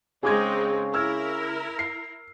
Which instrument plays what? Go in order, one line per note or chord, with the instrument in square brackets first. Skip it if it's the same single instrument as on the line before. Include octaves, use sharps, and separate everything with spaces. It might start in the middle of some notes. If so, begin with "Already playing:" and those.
[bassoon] C#3 [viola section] G#3 C4 D#4 [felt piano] G#4 D6 G#6
[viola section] E4 A#4 [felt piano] E6 F6 G#6
[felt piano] C7